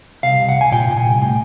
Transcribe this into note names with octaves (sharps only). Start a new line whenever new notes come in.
C2 F5
C2
F#5
C2 G#5
A#2 G5
A#2
G#5
C2
A2 G5